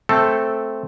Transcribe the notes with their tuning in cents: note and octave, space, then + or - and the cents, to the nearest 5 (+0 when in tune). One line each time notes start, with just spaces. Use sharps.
A3 +0 C4 +0 A4 +0